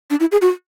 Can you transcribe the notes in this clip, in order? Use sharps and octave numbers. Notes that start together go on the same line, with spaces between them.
D4
E4
G#4
F#4